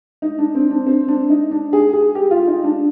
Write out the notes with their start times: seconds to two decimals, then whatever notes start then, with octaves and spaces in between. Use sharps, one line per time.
0.22 D#4
0.39 D4
0.55 C4
0.71 D4
0.86 C4
1.08 D4
1.30 D#4
1.51 D4
1.73 G#4
1.93 G#4
2.15 G4
2.31 F4
2.47 D#4
2.64 D4